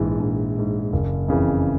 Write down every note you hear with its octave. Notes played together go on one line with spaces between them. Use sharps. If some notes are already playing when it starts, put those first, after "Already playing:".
Already playing: A#1 G#2 E3
A#1
G#2 E3
F#1
F2 C#3 E3